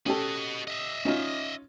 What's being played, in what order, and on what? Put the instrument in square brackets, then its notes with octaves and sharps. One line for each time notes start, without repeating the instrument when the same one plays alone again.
[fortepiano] C#4 G4 A4 [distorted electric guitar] F#4 D#5
[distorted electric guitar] D#5 E5
[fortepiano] C#4 D#4 F4